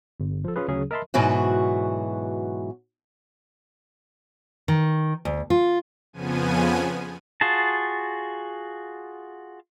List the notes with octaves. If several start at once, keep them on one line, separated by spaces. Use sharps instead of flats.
G1
F3 A4
C#4 F4 G#4 B4
D2 C#3 F#3 C#4 G#4
A#4 D#5 E5 A5 B5 C6
G#2 B2 E3 F#3 F#4
D#3
D2
F4
F2 C#3 F3 B3 G#5 D#7
F4 F#4 G#4 A5